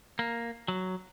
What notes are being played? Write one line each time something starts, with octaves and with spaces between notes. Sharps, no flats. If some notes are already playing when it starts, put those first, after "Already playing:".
A#3
F#3